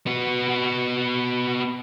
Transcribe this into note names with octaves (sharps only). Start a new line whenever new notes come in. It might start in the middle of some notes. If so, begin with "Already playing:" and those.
B3 F#4